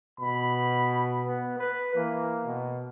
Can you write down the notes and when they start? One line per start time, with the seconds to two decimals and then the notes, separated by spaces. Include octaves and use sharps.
0.20 B2 B5
1.25 B3
1.59 B4
1.95 E3 A#3
2.44 B2